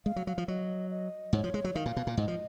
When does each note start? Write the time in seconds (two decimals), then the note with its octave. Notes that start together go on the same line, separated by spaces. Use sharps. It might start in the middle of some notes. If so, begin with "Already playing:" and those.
0.06 G#3 F5
0.16 F#3
0.27 F#3 F5
0.38 F3
0.48 F#3 D#5
0.91 D#5
1.33 G#2 C#5
1.44 F3
1.54 G#3
1.64 F#3
1.75 D#3 F5
1.86 A#2
1.97 B2
2.07 A#2
2.17 G#2 D#5
2.28 F3